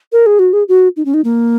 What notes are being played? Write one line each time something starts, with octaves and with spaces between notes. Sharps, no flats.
A#4
G#4
F#4
G#4
F#4
D#4
C#4
D#4
A#3